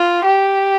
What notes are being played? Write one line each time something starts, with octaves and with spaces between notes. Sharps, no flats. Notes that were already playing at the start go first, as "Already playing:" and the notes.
Already playing: F4
G4